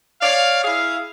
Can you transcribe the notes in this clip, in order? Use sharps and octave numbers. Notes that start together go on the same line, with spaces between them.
C#5 D5 F5
E4 G#4 F5